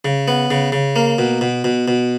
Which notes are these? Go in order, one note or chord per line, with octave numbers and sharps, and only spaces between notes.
C#3
B3
C#3
C#3
A#3
B2
B2
B2
B2